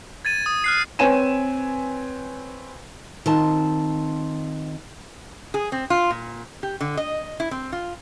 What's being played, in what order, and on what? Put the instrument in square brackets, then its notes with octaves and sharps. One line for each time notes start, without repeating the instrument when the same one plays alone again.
[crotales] G#6 A6 D#7
D#6
F6 F#6 C7
[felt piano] C4 B4 C#5 G#5 D#7 E7
[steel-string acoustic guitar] D#3 C4 F4 A5
[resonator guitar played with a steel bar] G#4
C4
F4
A#2
G4
D3
D#5
E4
C4
F4